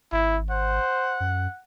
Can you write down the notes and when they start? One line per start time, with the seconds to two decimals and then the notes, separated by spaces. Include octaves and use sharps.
0.12 G#1 E4
0.50 C5 F#5
1.20 F#2